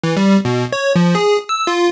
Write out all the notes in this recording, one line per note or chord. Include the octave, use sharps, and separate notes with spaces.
E3
G3
B2
C#5
F3
G#4
E6
F4